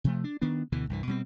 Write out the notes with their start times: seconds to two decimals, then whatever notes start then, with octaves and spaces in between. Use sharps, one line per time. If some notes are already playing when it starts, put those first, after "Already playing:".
0.04 C3 F3 A3
0.24 D4
0.42 D#3 B3 D4
0.72 D2 B2 D3 E3
0.89 C2 G2 E3
1.07 B2 G3 A3 C4